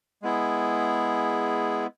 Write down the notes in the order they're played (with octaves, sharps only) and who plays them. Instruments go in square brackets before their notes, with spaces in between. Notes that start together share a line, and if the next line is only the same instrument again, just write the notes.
[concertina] G#3 B3 E4 G#4